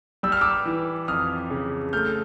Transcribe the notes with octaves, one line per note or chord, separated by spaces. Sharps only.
G3 E6
F6
D6 E6
E3
F2 D#6 F6
C#3
A3 F6 G6